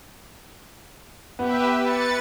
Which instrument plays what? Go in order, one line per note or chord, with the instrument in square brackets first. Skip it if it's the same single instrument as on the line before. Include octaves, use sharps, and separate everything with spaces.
[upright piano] B3 [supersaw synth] G4 B4 E5
[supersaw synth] B4 A6 C#7